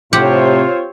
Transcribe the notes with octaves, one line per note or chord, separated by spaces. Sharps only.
A2 C3 C4 F4 G4 C5 C#5 F#5